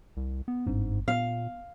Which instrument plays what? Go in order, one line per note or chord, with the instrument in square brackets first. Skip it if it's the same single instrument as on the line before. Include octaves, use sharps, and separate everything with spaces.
[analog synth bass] C2
B3
[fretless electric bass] G1 C4 D4 [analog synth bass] G#2
[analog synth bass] A#2 [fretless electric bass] B3 [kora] F5